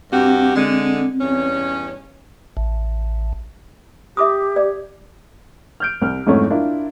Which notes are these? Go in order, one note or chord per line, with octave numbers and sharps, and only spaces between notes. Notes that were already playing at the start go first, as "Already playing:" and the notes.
G2 C4 F#4 G4
D3 G#3
E2 G2 C#4
A1
G4 E5 D6 D#6
D5
F6 G6 D7
C2 F6
F2 G#2 F#3 A3 C#4 E4
D4 E4 F4 A#4